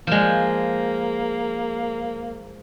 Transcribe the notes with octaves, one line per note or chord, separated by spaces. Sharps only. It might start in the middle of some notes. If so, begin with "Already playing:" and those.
F3 G#3 A#3